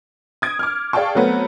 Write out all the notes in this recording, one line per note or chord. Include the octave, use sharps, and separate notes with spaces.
D#6 G#6 D7
D6 F6
G#4 D5 F5 G5 A5 C#6
F#3 A3 B3 C4